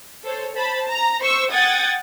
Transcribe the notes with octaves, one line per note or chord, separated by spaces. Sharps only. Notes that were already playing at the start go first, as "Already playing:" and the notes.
A4 C5 C#5
C5 A5 B5
A#5
C5 C#6 E6
F#5 G5 D#6 G#6 A6